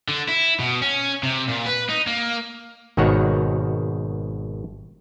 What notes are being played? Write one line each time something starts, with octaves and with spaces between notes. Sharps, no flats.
D3
E4
B2
C#4
C3
A#2
B4
D#4
A#3
G#1 B2 D#3 F#4 C#5 F#5